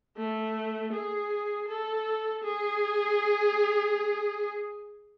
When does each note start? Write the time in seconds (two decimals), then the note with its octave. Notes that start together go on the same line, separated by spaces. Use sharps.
0.17 A3
0.93 G#4
1.68 A4
2.44 G#4